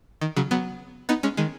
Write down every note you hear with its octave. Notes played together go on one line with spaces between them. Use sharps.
D#3
C#3 F#3
F#3 B3
B3 D#4
G#3 C#4
D#3 G#3